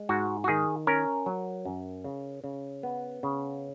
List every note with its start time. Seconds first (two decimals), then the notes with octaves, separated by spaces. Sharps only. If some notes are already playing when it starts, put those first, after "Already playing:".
Already playing: G#3
0.09 G#2 F#4
0.44 F#4
0.48 D#3 G#4
0.87 C#4 A#4
1.26 F#3
1.65 F#2
2.04 C#3
2.44 C#3
2.83 B3
3.23 C#3